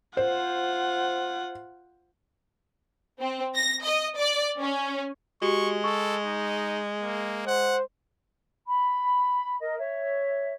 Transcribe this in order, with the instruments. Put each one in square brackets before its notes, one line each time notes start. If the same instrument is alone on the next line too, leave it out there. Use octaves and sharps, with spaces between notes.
[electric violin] F4 F#5 [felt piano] C5
[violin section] C4
A#6
D#5
D5
C#4
[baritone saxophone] G#3 [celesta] F#4 G4 [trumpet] C#6
[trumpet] A4 [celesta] C#6
[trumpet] D#4
A#3
[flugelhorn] C5 [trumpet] F#5
[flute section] B5
A#4 D#5
C#5 E5